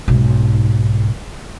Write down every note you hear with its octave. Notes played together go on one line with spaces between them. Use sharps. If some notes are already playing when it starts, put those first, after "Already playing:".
B1 G#2